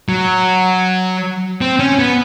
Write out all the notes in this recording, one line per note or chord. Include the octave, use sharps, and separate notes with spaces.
F#3
C4
C#4
B3